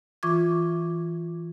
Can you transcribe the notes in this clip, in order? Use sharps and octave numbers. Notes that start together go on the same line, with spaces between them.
E3 F4 C#6 D6 G#6